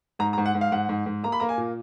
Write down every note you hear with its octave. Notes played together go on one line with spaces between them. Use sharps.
G#2 A#5
A#5
G#2
F#5
G#2
F5
G#2 F#5
G#2
G#2
A#3 A#5
B5
A#3 A#5
G#5
A#2